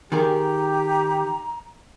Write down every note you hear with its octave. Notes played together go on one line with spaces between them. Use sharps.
D#3 G4 G#4 A#4 A#5